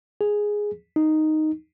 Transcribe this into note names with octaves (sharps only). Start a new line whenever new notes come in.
G#4
D#4